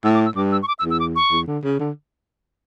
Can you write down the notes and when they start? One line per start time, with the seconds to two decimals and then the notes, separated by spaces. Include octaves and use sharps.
0.04 A2 E6
0.15 D6
0.25 E6
0.36 G2 D6
0.52 E6
0.63 C#6
0.68 D6
0.79 E6
0.84 E2
0.91 E6
1.00 D6
1.16 C#6
1.32 E2
1.47 D3
1.64 C#3
1.80 D3